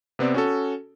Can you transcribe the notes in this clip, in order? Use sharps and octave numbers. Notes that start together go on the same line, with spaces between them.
C3 B3 C4 D5
C#4 F#4 A4